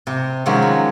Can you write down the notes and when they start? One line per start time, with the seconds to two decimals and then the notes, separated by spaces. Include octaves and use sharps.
0.07 C3
0.46 C3 D#3 F3 F#3 G#3 C#4
0.62 B5